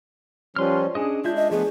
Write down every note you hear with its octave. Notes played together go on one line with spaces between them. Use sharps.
F3 G3 C#4 B4 C6 F6
C#4 D4 G#4 D#5
G#3 D4 F4 E5 G6
D#5
F3 A3 B3 G#4